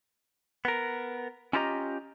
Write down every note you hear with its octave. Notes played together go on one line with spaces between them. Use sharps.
B3 A#4
C#4 E4 F4 G4 D#5 A#5